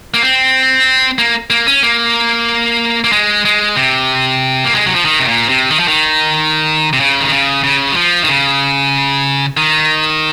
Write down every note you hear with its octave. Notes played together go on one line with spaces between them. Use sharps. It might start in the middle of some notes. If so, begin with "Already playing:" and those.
A#3
C4
A#3
A#3
C#4
A#3
A#3
G#3
G#3
C3
A#3
G#3
F#3
F3
D#3
C3
A#2
C3
D#3
F3
D#3
C3
C#3
D#3
C#3
C#3
F#3
F3
D#3
C#3
D#3